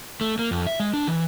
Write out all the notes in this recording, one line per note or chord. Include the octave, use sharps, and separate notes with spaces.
A3
A#3
F2
E5
G#3
D4
E3